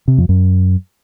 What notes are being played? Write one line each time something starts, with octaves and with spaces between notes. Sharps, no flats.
C3
F2
F#2